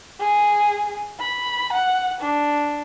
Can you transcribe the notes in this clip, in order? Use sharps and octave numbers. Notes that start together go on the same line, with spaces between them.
G#4
B5
F#5
D4